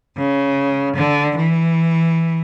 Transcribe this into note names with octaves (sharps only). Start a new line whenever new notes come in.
C#3
D3
E3